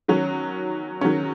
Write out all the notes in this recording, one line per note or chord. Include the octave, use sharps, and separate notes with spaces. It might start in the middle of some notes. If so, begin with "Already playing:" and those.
D#3 F#3 C#4
D#3 F#3 C#4